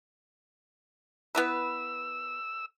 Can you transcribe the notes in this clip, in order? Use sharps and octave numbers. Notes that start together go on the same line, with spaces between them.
B3 E4 B4 E6